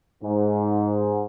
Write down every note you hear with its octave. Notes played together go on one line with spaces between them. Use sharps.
G#2